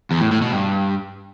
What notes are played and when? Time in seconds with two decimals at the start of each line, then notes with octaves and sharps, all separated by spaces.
0.11 E2
0.21 A2
0.31 A2
0.42 B2
0.52 G2